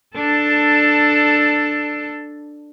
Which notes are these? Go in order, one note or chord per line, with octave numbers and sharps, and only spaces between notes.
D4 A4